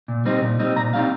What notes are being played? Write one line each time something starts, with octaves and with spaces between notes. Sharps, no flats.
A#2
G3 C4 D#4
A#2
G3 C4 D#4
A#2 A#5
G3 C4 D#4 F5